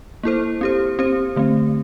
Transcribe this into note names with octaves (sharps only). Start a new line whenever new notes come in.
A#3 E4 A4 C5
C4 G4 C5
C4 G4 C5
D3 A3 C4